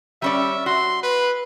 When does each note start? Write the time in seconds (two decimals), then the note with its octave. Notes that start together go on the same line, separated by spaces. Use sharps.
0.22 G3 C#4 D5 E5
0.66 F#4 C6
1.03 B4